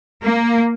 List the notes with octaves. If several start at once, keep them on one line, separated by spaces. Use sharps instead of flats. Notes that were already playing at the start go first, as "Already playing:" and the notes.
A#3